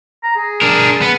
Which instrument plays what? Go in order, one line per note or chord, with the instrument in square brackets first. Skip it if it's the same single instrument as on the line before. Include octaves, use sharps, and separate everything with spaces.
[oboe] A#5
G#4
[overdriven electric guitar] D4 A#4
B3